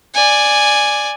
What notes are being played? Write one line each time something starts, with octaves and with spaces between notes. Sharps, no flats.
D5 G#5